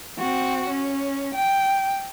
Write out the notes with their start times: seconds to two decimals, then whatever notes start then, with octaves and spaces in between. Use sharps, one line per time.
0.18 C4 F#4
0.69 C#4
1.35 G5